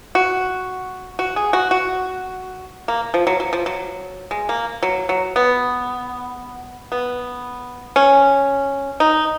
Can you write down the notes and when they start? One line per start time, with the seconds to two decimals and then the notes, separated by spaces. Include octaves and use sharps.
0.15 F#4
1.19 F#4
1.36 G#4
1.53 F#4
1.71 F#4
2.88 A#3
3.14 F3
3.27 F#3
3.40 F#3
3.53 F3
3.66 F#3
4.31 G#3
4.49 A#3
4.82 F#3
5.09 F#3
5.36 B3
6.92 B3
7.96 C#4
9.00 D#4